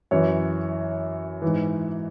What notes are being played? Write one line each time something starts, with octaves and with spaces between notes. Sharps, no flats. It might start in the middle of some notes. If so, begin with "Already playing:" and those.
F#2 E3 C#5
G#2 E3